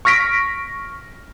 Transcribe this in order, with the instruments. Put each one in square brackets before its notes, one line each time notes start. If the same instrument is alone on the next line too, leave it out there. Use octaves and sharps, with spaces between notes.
[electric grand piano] C#6 F6 A#6 B6 D7